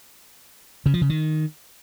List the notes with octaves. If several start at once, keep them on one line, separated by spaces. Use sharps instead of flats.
C#3
F3
C#3
D#3